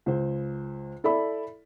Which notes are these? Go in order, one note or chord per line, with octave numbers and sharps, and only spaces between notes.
C#2 C5
E4 A4 D5 E5 B5